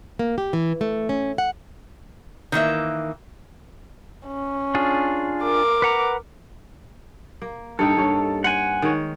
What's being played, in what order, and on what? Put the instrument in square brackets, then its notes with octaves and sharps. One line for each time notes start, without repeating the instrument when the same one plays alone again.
[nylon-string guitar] A#3
G4
E3
A3
C#4
F#5
[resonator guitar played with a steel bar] D#3 E3 A#3 E5
[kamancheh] C#4
[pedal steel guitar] D4 F4 G#4
[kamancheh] A#4 D6
[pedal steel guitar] B4 F#5 A#5
[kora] A#3
[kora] G2 D#4 G5 [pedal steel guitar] A4
[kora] G2 C#4
[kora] C5 [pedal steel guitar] F#5 G#5
[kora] D#3 G#3 C#5